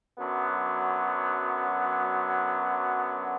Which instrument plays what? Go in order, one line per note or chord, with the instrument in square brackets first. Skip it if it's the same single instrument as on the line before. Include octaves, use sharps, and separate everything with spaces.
[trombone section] F#2 D3 F#3 B3